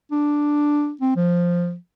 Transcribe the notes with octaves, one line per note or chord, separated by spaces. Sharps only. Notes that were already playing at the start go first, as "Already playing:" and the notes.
D4
C4
F3